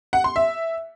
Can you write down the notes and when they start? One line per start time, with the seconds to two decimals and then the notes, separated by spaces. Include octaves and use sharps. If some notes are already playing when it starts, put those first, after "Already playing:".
0.13 F#5
0.24 C6
0.36 E5